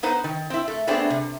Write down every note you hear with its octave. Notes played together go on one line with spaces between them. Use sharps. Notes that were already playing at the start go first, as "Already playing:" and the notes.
B3 D#4 B4 C5
D#3
C4 E4
A3
A3 B3 C4 D4 G#4
C3